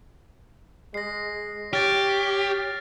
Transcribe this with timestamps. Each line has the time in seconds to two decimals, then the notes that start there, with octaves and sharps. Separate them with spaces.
0.94 G#3 A#6 C7
1.73 G4 C#5 F6 A6